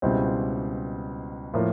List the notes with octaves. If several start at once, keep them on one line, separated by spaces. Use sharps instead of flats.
C#2 B2 G3 C4 E4
A2 F3 A#3